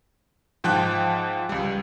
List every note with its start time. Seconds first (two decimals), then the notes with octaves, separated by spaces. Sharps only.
0.64 G#2 F3 G5 A5 F#6
1.49 C#2 G3